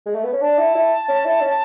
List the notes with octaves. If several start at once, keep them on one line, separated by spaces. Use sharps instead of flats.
G#3
A3
B3
C#4
D4 A5
E4
E4
C#4
E4
C#4